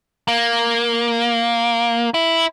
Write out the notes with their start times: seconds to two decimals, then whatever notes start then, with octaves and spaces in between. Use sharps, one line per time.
0.28 A#3
2.14 E4